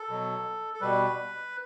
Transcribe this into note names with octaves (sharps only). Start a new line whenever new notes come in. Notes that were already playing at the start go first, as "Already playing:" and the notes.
Already playing: A4
B2 F#3
A4
B2 G3 B4